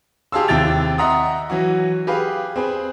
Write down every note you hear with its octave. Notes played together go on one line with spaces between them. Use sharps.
G4 G#4 F5 A5 C6 E6
D#2 C3 E4 G5 A6 F7
D#5 E5 F#5 A#5 C6 D#6
E3 F#3 F#4
G4 G#4 B4 F5
C4 G#4 B4